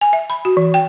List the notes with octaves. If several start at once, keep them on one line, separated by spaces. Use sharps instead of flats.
G#5
E5
B5
F#4
E3
G5